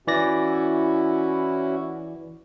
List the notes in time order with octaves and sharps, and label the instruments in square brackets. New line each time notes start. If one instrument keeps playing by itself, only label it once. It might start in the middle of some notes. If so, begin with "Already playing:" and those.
[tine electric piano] E3 D5 A#6 [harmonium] C#4 E4 F#4